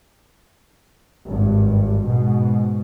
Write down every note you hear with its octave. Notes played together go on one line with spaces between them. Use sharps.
G#1 G2
G#2 B2